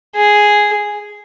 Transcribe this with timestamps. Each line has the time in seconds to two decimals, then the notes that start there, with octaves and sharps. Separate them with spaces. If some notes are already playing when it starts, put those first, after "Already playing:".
0.16 G#4